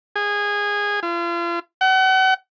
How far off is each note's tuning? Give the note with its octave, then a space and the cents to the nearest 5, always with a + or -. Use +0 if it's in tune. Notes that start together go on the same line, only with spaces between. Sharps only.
G#4 -15
F4 -40
F#5 +40